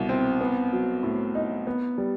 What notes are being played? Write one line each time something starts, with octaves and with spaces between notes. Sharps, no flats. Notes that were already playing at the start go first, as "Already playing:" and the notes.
Already playing: C2 B2
C4
B3
F#3
A2
D#4
B3
G3